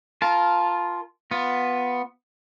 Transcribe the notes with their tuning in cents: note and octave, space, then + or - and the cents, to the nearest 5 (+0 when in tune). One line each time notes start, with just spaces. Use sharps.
F4 +0 A#4 +0 A5 -25
B3 +0 F4 +15